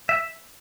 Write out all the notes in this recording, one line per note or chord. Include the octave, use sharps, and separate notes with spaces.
E5